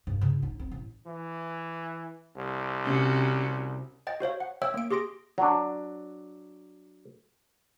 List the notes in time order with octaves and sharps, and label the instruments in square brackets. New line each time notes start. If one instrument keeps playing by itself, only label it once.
[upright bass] G2
C#3
D#4
C4
A1
[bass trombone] E3
C2
[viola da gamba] C3 C#4 F#4
[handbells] D#5 G5 A6
F#4 C5 C#5 F5
F#5
C#5 E5 G5 E6
A#3 D7
G4 G#4 C6 A#6 D7
[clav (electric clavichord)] F#3 D4